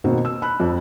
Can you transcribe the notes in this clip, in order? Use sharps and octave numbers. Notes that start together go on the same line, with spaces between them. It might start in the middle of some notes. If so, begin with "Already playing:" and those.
B2 D#3 A#3 C4 F#4
E6
B5 F#6
F2